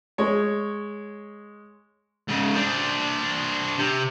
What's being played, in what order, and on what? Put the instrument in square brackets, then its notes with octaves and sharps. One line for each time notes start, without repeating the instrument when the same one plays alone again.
[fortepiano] G#3 C#5
[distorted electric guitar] G#2 C#3
D4 C5
C3